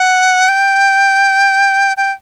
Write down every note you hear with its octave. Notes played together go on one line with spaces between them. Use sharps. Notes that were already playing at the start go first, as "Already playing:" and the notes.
Already playing: F#5
G5
G5